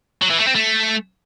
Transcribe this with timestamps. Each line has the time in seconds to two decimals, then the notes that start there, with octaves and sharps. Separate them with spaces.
0.22 F#3
0.30 E3
0.39 A3
0.47 C4
0.55 A3